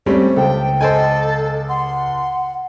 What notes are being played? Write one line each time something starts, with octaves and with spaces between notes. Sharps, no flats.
G3 A3 C4 C#4 C5
C#2 A4 G5
A4 C5 D#5 G5 G#5
F#5 C6